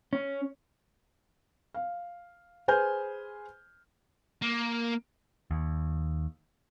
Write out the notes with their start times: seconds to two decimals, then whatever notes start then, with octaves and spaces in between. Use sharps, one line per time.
0.13 C#4
1.74 F5
2.68 G#4 B4 C5 G#5 F6 G6
4.42 A#3
5.51 D#2